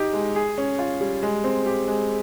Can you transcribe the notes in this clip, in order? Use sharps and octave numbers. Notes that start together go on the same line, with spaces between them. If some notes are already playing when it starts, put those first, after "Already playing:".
Already playing: D#4 G4
G#3
G#4
C#4
F4
G3
G#3
C4
G4
G#3